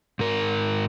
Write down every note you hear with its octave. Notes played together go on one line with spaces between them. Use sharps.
G#2 A#4